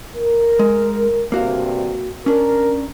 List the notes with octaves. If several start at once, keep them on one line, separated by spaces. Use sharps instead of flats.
A#4
G#3
D2 G2 C3 A#3 F#4 F5
C#4 D4 A#4